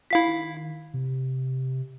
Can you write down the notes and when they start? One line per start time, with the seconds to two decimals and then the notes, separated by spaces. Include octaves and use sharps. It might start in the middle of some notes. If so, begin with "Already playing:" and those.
0.11 E4 F4 F5 B6
0.27 D#3
0.94 C3